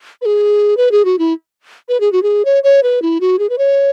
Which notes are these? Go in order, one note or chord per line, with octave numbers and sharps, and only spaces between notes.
B4
G#4
B4
G#4
F#4
E4
B4
G#4
F#4
G#4
C#5
C#5
B4
E4
F#4
G#4
B4
C#5